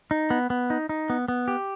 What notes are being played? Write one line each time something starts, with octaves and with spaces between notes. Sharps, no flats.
D#4
B3
B3
D#4
D#4
B3
B3
G4